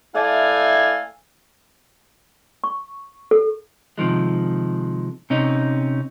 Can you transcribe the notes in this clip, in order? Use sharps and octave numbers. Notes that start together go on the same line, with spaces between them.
A3 E4 D5 F5 G#5
C#6
A4
C3 D#3 F3 G#3
C3 C#4 D#4